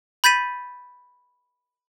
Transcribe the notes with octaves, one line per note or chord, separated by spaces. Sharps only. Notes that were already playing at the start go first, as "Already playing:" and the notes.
B5 G6 A6 B6 D#7